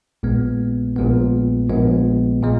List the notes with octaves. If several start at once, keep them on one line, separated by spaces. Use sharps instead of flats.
A#1 A#2 G#3 B3
A#1 A#2 G#3 B3
A#1 A#2 G#3 B3
A#2 G#3